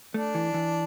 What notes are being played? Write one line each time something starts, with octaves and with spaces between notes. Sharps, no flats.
A3 D4
E3
E3